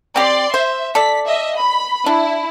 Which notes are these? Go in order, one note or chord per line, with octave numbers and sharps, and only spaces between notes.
C4 G4 D5 C6
C5 E5
A4 D5 B6
D#5 E5
B5
D4 E4